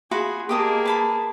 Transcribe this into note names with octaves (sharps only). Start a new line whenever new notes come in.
F4 F#4 G#4 B5
A#3 G4 G#4 D#5 A5
B4 A5 B5